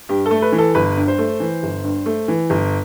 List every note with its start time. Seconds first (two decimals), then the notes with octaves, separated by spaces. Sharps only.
0.09 G2 G4
0.26 A4
0.31 A3
0.42 B4
0.52 E3
0.58 A4
0.75 G1 B4
0.97 G2
1.08 C5
1.18 A3
1.40 E3
1.63 G1
1.84 G2
2.06 A3
2.28 E3
2.50 G1